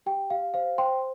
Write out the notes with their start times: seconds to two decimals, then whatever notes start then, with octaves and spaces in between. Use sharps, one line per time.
0.06 G4 G5
0.30 G4 F5
0.54 C5 F5
0.78 C5 G5 C6